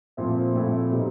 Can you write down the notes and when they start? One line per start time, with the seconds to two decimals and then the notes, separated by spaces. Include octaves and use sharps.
0.17 A#2 F3 A3 C4 E4
0.54 A#2 F3 A3 C4 E4
0.91 B2 G3 B3 D#4